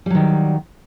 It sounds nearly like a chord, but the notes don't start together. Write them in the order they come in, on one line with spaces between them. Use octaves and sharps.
G3 F#3 D#3